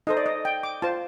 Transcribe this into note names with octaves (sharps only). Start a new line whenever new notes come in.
D#4 A4 C5 D#5
D5
D#5
G5
D6
F4 C5 A5